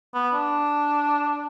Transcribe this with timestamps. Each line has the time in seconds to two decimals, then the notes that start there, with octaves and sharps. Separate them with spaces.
0.14 B3
0.34 D4